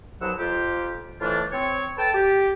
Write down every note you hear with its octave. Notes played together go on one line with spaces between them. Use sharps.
C2 G2 F3 F#3 F#5 E6
F2 F4 G4
F2 A2 E3 A3 D4 F4
C4 C#5
A4 B4 G5 A5
G4